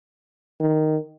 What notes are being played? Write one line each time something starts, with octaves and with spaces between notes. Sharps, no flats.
D#3